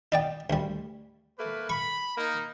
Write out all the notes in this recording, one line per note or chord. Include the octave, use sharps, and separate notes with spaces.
D#4 D5 G5
D2 G3
A3 A#3 B4
B5 C#6
A#3 D#4